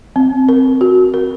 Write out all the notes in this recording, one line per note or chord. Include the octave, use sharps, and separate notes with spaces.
C4
A#4
F#4
A#4